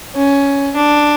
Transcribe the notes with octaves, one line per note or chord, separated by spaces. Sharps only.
C#4
D4